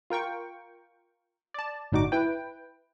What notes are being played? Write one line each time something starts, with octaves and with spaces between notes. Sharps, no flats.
F4 A#4 G5 C#6
D5 A5
G1 A2 D4 D#4 F#4 D6
E4 B4 G5